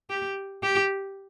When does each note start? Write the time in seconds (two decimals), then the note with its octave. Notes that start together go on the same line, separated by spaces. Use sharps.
0.10 G4
0.63 G4